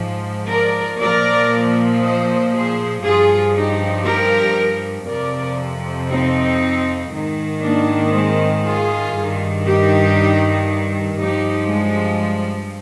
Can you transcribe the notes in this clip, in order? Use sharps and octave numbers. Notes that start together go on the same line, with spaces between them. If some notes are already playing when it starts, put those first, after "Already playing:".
Already playing: G#2 F3
A#4 D5
A#2 F3 A#4 D5
C5 D#5
G#4 C5
G2 F3 F4 G#4
D#4 G4
G4 A#4
F2 C3 F3 A#4 D5
C4 D#4
G#2 D#3
A#3 D4
G#3 C4
F4 G#4
G2 D#3
D#4 G4
G2 F3 D#4 G4
G#3